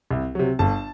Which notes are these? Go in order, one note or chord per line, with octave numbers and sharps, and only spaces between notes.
C2
C3 F#3
G1 A5